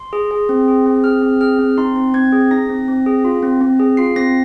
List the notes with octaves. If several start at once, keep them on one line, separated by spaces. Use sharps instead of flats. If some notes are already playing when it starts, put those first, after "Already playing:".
Already playing: C6
G#4
G#4
C4
G#4
C4
G#4 F6
C4
G#4 F6
C4
D#4 C6
C4
C4 G#6
G#4
D#4 A#6
C4
C4
G#4
F4
C4
C4
G#4
F4 C7
C4 A#6